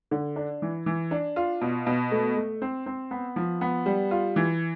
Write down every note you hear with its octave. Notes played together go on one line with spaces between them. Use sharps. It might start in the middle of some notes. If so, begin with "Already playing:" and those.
D3
D4
E3
E3
D4
F4
B2
B2
A3
A3
C4
C4
B3
F3
B3
G3
F4
E3